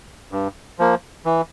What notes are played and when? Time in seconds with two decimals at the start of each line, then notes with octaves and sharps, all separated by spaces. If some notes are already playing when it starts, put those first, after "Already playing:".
0.32 G2
0.79 F3 A#3
1.25 E3